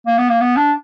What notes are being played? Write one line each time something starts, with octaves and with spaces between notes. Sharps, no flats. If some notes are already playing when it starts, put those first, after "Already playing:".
A#3
B3
A#3
B3
D4